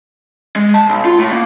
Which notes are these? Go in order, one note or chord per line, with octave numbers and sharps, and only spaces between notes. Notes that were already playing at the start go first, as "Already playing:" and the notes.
G#3
A5
B1
F4
A2
A#3